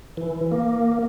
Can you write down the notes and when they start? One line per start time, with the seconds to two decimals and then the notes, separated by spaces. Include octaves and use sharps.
0.17 E3
0.52 A#3